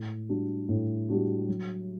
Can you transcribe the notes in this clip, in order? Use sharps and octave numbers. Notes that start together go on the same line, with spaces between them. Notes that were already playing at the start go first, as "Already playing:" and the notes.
Already playing: A2
G3 D4 F#4
A2
G3 D4 F#4
F#3